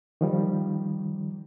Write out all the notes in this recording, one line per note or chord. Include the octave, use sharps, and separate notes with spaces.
D#3 F3 G3